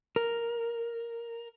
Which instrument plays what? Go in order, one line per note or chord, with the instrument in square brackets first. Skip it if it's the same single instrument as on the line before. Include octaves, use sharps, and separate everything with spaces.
[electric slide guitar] A#4